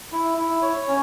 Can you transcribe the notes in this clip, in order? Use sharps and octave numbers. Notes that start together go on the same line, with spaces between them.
E4
E4
C#5
C#4